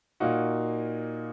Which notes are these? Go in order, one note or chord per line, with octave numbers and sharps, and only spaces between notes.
A#2 A#3 D#4 F#4